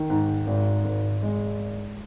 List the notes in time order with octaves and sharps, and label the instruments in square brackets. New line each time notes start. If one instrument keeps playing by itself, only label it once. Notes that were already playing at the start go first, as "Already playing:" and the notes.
Already playing: [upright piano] D#3
G#2
G#1
G#1
G#3